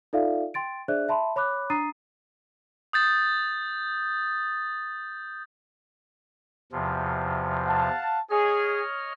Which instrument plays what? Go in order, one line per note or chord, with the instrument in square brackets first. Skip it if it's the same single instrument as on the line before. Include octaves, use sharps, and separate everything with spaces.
[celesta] D#4 F4 A4 D5 E5 F5
G5 C6 A6 D7
D4 G#4 C5 D5 E5 F#6
E5 A5 B5 C6
C#5 B5 D6 F#6
D4 A#5 D#6 A6 C7 D#7
[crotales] D#6 G6 A6
[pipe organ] E2 C3 F3
[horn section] F5 F#5 A5
[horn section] G#4 [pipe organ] C#5 D#5 F6